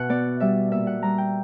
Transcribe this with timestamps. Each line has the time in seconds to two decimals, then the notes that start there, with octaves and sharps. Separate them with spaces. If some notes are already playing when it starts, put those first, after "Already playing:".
Already playing: B2 E5 F#5
0.09 B3 D5
0.40 G3 E5
0.71 A#2 E5
0.87 F#5
1.03 G3 A#5
1.18 G5